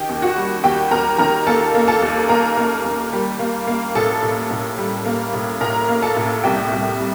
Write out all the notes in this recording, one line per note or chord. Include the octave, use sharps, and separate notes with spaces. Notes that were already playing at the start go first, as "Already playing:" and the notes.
Already playing: D#3 G4 G5
D#2
F#4 F#5
G3
D#2 G4 G5
D#2 A#4 A#5
D#3 A#4 A#5
A#3 A4 A5
A#3
A4 A5
D#2
A#3 A#4 A#5
A#3
D#2
G3
A#3
A#3
A2 A4 A5
A2
A2
G3
A#3
A2
A2 A#4 A#5
A#3
A4 A5
A2
C2 G4 G5
C2
G3